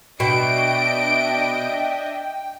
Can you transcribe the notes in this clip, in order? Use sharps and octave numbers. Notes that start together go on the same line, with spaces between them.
B2 D4 D#5 E5 G5 D7